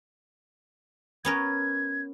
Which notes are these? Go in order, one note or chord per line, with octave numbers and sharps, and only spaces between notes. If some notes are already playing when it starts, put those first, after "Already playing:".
B3 C#4 A#4 G#6